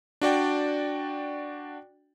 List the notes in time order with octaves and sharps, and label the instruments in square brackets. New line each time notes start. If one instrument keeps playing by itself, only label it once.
[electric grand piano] D4 F#4 D5 G5